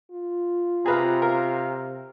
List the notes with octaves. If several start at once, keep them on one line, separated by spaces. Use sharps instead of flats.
F4
C3 G#4 B4 F5 A#5
A#4 F5